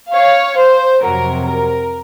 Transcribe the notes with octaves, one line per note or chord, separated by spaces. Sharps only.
C#5 F5
C5
F2 C3 F#3 A#4
A#4